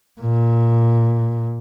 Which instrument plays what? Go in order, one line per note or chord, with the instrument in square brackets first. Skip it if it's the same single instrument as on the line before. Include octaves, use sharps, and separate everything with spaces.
[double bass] A#2